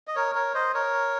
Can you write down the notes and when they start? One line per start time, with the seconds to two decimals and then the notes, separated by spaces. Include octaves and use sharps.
0.07 D#5
0.15 A#4 C#5
0.35 A#4 C#5
0.54 C5 D#5
0.74 A#4 C#5